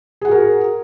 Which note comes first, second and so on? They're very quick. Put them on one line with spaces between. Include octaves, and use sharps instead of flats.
G#4 F#5 F#4 A#4